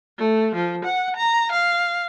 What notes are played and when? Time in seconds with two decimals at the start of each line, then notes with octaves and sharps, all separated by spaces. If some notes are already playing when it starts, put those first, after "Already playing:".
0.19 A3
0.56 F3
0.86 F#5
1.17 A#5
1.53 F5